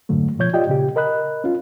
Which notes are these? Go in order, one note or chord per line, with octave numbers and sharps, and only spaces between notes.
F2 G#2 D3 F#3 A3
B2 F3 C#5 G6 G#6
F4 G4 D5 D#5 G5
A#2 C#3 G4
A#4 D#5 B5 F#6
C#4 F4